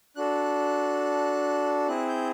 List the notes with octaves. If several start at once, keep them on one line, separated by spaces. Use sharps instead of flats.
D4 F#4 A4 F#6
C4 E4 G#4 F#6
G6